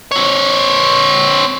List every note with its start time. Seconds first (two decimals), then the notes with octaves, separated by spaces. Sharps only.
0.11 C4 C#5